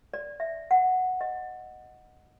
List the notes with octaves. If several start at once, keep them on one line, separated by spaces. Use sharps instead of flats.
D5
E5
F#5
D#5